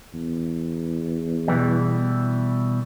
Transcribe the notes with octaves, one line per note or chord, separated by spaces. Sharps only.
E2
B2 E3 G3